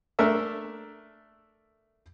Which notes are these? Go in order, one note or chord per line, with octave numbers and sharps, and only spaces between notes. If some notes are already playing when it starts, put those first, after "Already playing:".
A3 D4 A#4 E5 E6